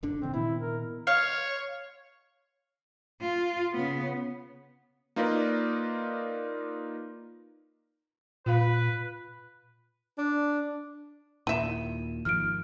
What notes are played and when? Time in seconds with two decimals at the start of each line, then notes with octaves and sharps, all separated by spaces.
0.03 F#1 D3 D4
0.22 C3 D#3 E3 C4
0.34 A#2 D#3 B3 E4
0.61 A#4
1.07 C#5 F5
3.21 F4
3.73 C#3 B3
5.16 A#3 D#4 F4 A#4 B4 D5
8.46 A#2 F4 B4 F5
10.18 D4
11.47 D#2 A#2 E4 E5 D#7 E7
12.25 G#1 D#3 F3 F6 D7